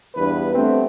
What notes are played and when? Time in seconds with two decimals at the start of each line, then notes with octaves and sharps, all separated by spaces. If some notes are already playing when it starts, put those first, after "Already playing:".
0.16 E2 G2 B4
0.55 G2 A3 B3 C4